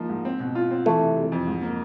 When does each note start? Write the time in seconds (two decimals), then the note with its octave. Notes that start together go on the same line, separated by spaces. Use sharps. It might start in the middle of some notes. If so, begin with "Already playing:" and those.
Already playing: F3 A#3 D#4
0.09 G#2
0.25 C4
0.40 B2
0.55 F4
0.71 C4
0.86 E3 A3
1.01 C3
1.16 C3
1.32 F2
1.47 G#2
1.62 A#3